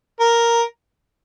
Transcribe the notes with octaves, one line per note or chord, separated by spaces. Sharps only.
A#4